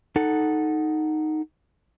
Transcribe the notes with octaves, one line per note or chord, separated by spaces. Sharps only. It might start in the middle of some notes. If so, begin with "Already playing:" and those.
D#4 A4 F#5